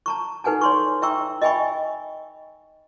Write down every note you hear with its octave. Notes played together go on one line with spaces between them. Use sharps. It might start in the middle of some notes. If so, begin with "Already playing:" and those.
A5 A#5 C#6
D#4 A4 B4 F#5 G#5 A5
C#5 C6 C#6
E5 G5 A#5 C#6 E6
D#5 E5 G5 G#5 B5 C#6